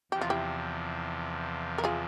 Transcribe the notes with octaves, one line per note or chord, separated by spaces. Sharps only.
E2 C3 F3 G4
F4
E4 G4
A#4
F4 G#4